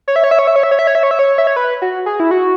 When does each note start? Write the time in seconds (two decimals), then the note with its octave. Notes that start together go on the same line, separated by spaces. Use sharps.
0.08 C#5
0.16 E5
0.24 C#5
0.31 E5
0.39 C#5
0.47 E5
0.56 C#5
0.63 E5
0.71 C#5
0.79 E5
0.87 C#5
0.95 E5
1.03 C#5
1.11 E5
1.19 C#5
1.38 E5
1.47 C#5
1.56 B4
1.82 F#4
2.06 G#4
2.20 E4
2.31 F#4